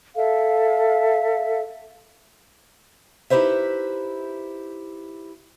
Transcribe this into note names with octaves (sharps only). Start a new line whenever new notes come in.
A4 E5 F5
D#4 E4 G4 B4 C5 E5